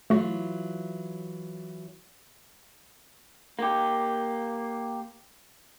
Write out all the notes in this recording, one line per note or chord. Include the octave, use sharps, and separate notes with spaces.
E3 F#3 A3 F4 F#4
A#3 G4